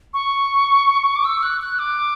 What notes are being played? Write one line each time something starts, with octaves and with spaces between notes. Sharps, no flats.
C#6
D6
E6
F#6
F#6
D6